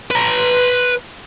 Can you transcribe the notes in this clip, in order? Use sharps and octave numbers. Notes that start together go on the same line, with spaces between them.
B4 A#5